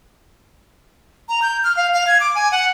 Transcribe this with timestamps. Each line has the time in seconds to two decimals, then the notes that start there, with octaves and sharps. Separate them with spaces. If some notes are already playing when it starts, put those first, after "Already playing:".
1.29 A#5
1.42 G6
1.64 F6
1.77 F5
1.93 F5
2.07 G#6
2.20 D6
2.35 G#5
2.52 F#5